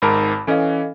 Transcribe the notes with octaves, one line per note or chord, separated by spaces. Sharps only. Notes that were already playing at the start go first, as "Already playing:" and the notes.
G#1 G#2 A#4 A5 B5
E3 C#4 A4 D#5 F5